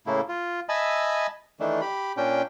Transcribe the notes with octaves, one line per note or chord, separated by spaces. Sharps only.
A2 C#3 A3 A#3 E4
F4
D#5 E5 G#5 A5 B5 E6
D#3 E3 A3 D4
G4 B5
A#2 C#4 D4 G5